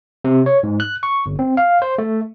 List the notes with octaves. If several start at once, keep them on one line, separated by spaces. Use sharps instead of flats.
C3
C#5
G#2
F#6
C#6
G1
C4
F5
C5
A3